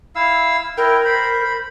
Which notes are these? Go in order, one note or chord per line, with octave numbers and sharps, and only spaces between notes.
E4 F5 E6
E4 A#4 G5
C5 B5